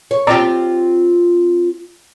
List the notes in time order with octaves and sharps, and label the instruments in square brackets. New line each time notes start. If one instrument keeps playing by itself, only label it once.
[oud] C#5
[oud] C4 F4 G4 [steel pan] D5 A#5